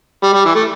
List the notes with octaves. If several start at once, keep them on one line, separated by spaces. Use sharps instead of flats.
G3
G3
E3
A3